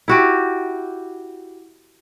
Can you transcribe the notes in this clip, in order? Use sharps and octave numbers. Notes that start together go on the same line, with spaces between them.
E4 F#4 G4